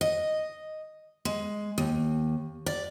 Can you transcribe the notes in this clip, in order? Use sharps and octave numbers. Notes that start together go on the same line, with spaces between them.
D#5
G#3
D#2
D5